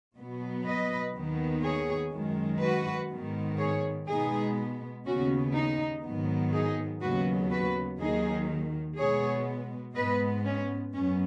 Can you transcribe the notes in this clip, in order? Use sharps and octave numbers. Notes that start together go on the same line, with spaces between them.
B2 F#3 B3
B4 D#5
D#2 D#3 B3
G#4 C#5
F#2 D#3 G#3
F#4 B4
G#2 D#3 B3
G#4 C#5
B2 G#3 B3 D#4 G#4
D#2 C#3 B3 C#4 F#4
D#4
G#2 D#3 F#3 B3
D#4 G#4
D#2 C#3 F#3 B3 F#4 B4
F#4 B4
D#2 D#3 F#3 D#4 G#4
B2 G#3 B3 G#4 C#5
G#2 G#3 B3 B4 D#5
C#4
F#2 F#3 B3 C#4